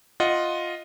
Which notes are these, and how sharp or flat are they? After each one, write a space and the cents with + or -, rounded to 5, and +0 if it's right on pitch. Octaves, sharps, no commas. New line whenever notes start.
F4 +5 D#5 +0 F#5 +0